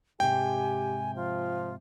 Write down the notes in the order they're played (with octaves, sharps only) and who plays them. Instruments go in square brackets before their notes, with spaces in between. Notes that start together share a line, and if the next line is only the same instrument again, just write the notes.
[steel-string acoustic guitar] G#2 C3 [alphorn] G4 [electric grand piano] G5 [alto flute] G#5
[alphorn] F3 [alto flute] F4